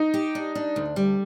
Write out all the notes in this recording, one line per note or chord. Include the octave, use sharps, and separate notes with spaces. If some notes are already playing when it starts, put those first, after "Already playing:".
Already playing: D#4
G4
D4
D4
D2
G3